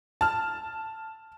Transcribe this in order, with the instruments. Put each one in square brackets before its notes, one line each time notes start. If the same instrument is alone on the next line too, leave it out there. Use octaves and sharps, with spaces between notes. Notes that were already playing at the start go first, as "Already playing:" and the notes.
[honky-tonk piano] A5 F6